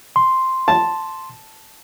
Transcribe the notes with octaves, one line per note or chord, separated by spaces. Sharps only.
C6
A5